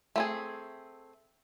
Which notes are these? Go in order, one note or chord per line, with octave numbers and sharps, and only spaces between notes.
A3 C4 G#4